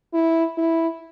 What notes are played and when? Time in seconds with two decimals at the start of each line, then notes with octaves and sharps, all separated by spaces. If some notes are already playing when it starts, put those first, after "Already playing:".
0.13 E4
0.57 E4